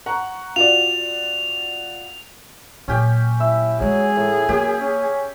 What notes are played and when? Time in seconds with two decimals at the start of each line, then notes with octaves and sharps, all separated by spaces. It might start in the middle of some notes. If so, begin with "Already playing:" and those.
0.06 F#5 A#5 C#6
0.56 F4 F#4 D5 F7
2.88 A#2 F#3 C#4 G4 G5
3.40 E4 E5
3.81 F#3 G#3 C#4 G#4
4.17 A2
4.49 F#2 A#3 G4 G#5
4.80 C#4